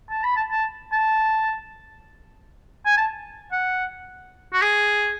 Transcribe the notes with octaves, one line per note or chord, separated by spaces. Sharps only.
A5
B5
A5
A5
A5
G#5
A5
F#5
F#4
G#4